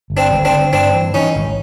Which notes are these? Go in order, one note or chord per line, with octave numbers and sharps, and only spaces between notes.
G1
C4 D4
G1
C4 D4
D3
G2 C4 D4
E3
E3 C#4 D#4
G#1